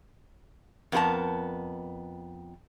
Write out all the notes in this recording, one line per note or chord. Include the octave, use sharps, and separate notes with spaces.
F2 B3 F#4 A#4 A5